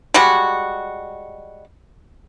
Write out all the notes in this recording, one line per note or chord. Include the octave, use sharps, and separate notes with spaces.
G3 G#3 F#4